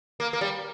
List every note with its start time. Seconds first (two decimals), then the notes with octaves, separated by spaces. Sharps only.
0.20 A#3
0.33 A#3
0.41 G3